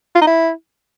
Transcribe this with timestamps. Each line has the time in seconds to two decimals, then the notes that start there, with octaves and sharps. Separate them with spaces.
0.15 F4
0.21 D#4
0.27 E4